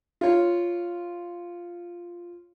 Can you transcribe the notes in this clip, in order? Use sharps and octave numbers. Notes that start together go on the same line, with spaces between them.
F4 C#5